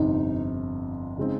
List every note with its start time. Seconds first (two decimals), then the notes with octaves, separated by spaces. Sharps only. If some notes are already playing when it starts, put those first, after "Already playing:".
Already playing: G1 F2 C3 D#4
1.18 C#3 G#3 C4 D#4